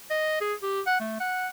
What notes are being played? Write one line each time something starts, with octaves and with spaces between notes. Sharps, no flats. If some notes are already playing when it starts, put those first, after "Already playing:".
D#5
G#4
G4
F#5
A3
F#5